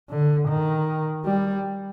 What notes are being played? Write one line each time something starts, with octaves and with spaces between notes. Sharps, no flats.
D3
D#3
G3